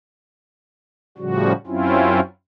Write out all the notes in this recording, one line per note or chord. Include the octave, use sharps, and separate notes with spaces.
A2 C#3 F3 G3 F#4
F#2 F#3 C4 C#4 E4 F4